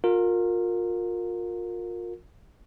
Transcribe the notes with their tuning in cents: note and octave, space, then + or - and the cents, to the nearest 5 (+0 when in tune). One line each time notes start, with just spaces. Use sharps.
F4 +35 A#4 -15